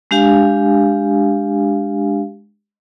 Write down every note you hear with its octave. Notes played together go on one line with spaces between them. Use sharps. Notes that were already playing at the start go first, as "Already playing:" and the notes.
G#3 D4 G4 F5 G#5